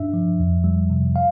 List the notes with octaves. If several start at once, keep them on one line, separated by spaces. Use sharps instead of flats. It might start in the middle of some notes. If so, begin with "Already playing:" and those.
Already playing: G2 D4 E5
F3
F2
G3
C3
F5